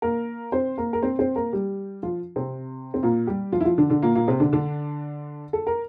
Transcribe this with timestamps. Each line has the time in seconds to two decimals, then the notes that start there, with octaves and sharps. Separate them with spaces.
0.02 A#3 A#4
0.52 C4 C5
0.78 A#3 A#4
0.93 A#4
1.03 C4 C5
1.19 C4 C5
1.36 A#3 A#4
1.52 G3 G4
2.03 F3 F4
2.36 C3 C4
2.94 C4
3.03 A#2 A#3
3.27 G3 G4
3.52 F3 F4
3.60 E4
3.65 F3 F4
3.78 D3 D4
3.90 D3 D4
4.03 A#2 A#3
4.15 A#2 A#3
4.28 C3 C4
4.40 D3 D4
4.53 D3 D4
5.53 A4
5.67 A#4